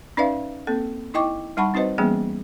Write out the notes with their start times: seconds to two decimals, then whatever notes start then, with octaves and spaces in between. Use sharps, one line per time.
0.17 C#4 D#4 B4 D5 E5 F5
0.67 A#3 C4 A4
1.14 D#4 E4 D#5 G5 C#6 D6
1.57 G3 D#4 F#5 A5 B5 C#6
1.74 C4 D#4 F#4 B4 C5 D#5
1.98 E3 G3 A#3 B3 C#4 G#4